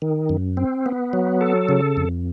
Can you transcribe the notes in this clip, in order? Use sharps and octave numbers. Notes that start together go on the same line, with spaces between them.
D#3
F#2
C4
B3
F#3
A4
C#3
F2